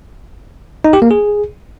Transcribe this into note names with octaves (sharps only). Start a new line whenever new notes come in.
D#4
G4
A#3
G#4